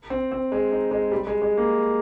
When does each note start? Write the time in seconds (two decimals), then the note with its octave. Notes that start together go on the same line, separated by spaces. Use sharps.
0.10 C4
0.32 C4
0.52 G#3
0.71 D#4
0.91 G#3
1.12 G3
1.27 G#3
1.42 G#3
1.57 A#3